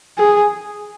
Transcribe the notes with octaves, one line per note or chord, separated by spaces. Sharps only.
G#4